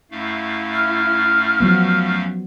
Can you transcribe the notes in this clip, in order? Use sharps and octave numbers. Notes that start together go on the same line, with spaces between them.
F#2 A3 E4 F5
F6
F3 F#3 B3